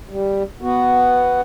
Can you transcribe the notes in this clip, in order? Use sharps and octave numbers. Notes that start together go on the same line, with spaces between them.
G3
B3 F#4